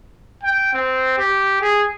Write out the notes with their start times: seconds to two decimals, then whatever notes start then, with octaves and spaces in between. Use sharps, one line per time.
0.43 G5
0.73 C4
1.18 G4
1.61 G#4